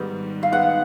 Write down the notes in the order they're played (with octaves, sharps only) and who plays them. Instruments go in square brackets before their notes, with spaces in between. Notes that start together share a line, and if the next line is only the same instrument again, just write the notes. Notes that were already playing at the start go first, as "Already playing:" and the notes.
Already playing: [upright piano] G#2 D#3 G3 B3
[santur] F5
[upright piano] D#3 G#3 B3 [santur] F#5